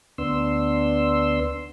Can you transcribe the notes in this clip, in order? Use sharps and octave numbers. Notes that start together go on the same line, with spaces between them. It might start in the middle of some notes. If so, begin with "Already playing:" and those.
D2 B3 D4 C6 E6